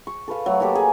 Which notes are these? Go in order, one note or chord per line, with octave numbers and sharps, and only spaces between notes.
C#6
A4 B4 F5
F#3 A3
A#3 F#4 G4 A4
G#4